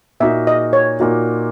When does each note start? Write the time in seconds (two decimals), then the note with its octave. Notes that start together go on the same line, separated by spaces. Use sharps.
0.20 A#2 A#3 D#4 F#4 E5
0.47 D#5
0.73 C#5
1.00 A#2 A#3 D#4 F#4